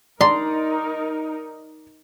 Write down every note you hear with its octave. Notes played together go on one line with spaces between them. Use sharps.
D#4 A#4 D5 A#5 C6